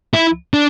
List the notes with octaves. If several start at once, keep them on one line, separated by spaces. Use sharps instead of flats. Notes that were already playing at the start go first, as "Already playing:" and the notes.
E4
D4